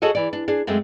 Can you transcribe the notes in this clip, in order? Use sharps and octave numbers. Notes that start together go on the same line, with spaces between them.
F#4 G#4 A4 C#5 D#5
E3 D5
D4
D4 G#4
F#2 G#3 A3 C4